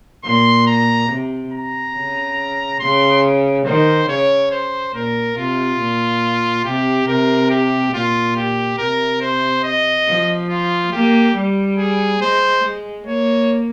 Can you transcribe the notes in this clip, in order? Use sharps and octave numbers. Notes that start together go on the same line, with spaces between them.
A#2 C6
A#5
C3
A#5
C#3
C#3 C6
D#3 C5
C#3 C#5
C5
A#2 A#4
C3 F4
A#2
C3 G4
C3 A#4
G4
A#2 F4
G4
C3 A#4
C5
D#5
F3
F4
A#3 G4
G3
G#4
G#3 C5
G#3
A#3 C#5